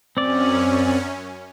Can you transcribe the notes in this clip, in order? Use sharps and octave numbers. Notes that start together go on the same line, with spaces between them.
F#2 C4 C#4 D5